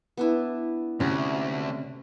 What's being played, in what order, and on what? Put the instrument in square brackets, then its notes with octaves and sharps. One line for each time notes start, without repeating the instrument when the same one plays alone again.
[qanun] B3 D4 E4
[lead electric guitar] D2 [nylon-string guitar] C3 C#4